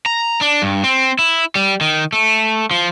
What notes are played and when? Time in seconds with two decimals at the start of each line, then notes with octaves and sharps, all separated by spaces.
0.06 A#5
0.41 D4
0.62 G2
0.84 C4
1.19 E4
1.55 G3
1.81 D#3
2.13 A3
2.71 F3